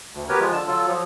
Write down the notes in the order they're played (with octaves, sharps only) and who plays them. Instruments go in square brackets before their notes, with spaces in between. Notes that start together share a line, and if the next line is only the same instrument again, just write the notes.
[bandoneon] D2
B3 G4 A#4 B4 C#5
F3 G#3 F4
D3 A5
F#3 F4 A4
F3 F#3